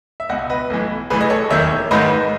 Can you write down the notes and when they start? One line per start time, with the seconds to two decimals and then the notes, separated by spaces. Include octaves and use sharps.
0.20 E5
0.29 C#2 B2 D#5 F#5
0.50 B4 D#5
0.70 B1 A2 E3
1.10 A1 A2 E3 G#4 B4
1.21 D#5
1.30 A4 C#5
1.50 E1 D#2 D#3 C#5 E5
1.91 A1 G#2 D#3 B4 D#5